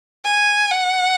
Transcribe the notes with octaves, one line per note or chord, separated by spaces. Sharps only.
G#5
F#5